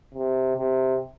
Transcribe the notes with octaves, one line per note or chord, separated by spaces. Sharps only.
C3
C3